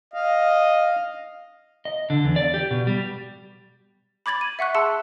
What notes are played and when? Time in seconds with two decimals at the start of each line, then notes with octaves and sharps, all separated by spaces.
0.14 D#5 F5
1.85 D#5
2.10 D3
2.24 E2
2.36 D5
2.54 G4
2.71 B2
2.87 G3
4.26 B5 D6 G#6 A6 F#7
4.41 D#7
4.59 E5 F#5 C#6 F#6
4.75 G#4 A5 C6 E6 C#7